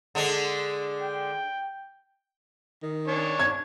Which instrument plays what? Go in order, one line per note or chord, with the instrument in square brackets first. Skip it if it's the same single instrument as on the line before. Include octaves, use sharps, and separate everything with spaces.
[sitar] D3 G#3 D4
[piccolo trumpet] G5
[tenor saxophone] D#3
[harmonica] D4 C#5
[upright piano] G#6